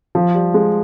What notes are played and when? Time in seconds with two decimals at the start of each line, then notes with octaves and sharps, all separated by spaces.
0.15 F3
0.34 G3
0.54 G#3